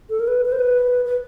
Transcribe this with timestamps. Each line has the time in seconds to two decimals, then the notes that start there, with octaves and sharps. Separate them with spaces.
0.10 A4
0.20 A#4
0.27 B4
0.45 B4
0.52 C5
0.59 B4
1.05 B4